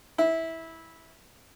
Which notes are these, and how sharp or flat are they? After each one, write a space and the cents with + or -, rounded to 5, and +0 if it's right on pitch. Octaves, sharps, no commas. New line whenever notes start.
E4 -15